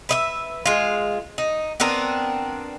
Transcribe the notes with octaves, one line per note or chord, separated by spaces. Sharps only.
B4 D#5 E5
G#3 F4
D#4
B3 C4 D4 A#4